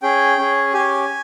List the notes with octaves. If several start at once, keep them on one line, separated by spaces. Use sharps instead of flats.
C#4 G#4 G5
C#4 G#4
C#4 G4 G#5